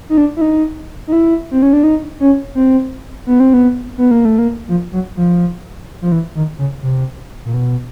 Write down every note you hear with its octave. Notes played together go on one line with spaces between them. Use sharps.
D#4
D4
E4
D#4
D#4
E4
C4
C#4
D4
D#4
C#4
C4
B3
C4
B3
B3
A#3
A3
A#3
F3
F#3
F3
F3
E3
D#3
C#3
C3
A#2
B2